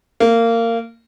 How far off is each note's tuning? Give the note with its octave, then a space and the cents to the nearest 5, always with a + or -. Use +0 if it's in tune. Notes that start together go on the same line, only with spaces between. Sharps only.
A#3 -20